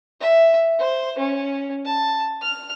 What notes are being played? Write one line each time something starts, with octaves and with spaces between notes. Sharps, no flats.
E5
C5
C#4
A5
F6